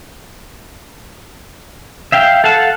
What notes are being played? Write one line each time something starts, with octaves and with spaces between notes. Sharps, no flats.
E5 F5 G5
A4 F5 F#5 A5